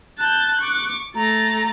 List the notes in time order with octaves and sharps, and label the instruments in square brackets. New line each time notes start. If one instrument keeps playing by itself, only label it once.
[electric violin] A5 G6 [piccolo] F#6
[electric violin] C#6 D6
[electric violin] A3 A6 [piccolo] A#5